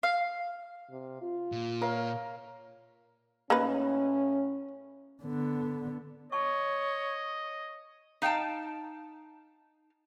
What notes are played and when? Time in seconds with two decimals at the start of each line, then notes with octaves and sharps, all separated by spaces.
0.03 F5
0.91 C3
1.22 F4
1.52 A#2
1.81 A#4 C#5 F5
3.50 A2 A#3 C#4 D#4 B4
5.22 D3 B3
6.32 C#5 D#5 A5 C#6
8.22 D#4 F5 G5 A5